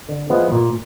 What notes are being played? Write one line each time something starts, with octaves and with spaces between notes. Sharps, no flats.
D3
F3 G#3 B3 E4
A#2